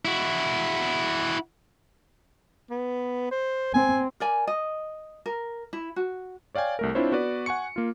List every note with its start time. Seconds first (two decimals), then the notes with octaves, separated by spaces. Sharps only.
0.05 E4 F#4
2.71 B3
3.31 C5
3.74 C4 G#5
4.20 A#4 D5 G#5
4.47 D#5
5.26 A#4
5.73 E4
5.96 F#4
6.55 C#5 D5 F5 G5 G#5
6.79 C2 A3 A#4
6.95 C4 D4 E4 F4 C5 C#5
7.12 B3 F#4 B4 D5
7.46 F#5 G#5 C#6 C#7
7.76 A#3 F4